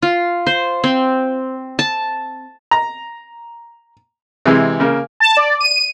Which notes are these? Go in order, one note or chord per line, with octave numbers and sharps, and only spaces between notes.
F4
C5
C4
A5
A#5
C3 E3 G#3
C#3 A#3
A5
D5
D#7